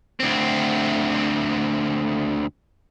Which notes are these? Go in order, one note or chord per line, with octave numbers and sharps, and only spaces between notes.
D2 C4